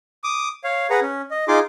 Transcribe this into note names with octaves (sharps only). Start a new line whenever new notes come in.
D6 D#6
C#5 F5
G#4 B4 F#5 A#5
C#4
D#5
D#4 F4 G#4 C6 D6